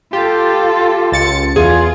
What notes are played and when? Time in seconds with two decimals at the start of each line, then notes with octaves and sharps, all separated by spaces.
0.13 F4 G4 A4
1.12 C#2 A6 C#7
1.56 E2 F4 G#4